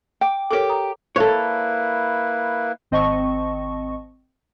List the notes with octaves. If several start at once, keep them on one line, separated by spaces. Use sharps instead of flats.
G5 D6
G4 A4 A#4 C#5 D6
A#5 D#6
A#3 E4 A4 B4 C#5
G#1 C4 D#5 A5 C#6